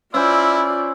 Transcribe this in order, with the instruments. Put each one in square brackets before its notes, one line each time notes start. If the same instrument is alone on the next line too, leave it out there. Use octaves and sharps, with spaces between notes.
[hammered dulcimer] C#4 C5 [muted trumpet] E4 [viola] F4 D5 [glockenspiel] G#5 E6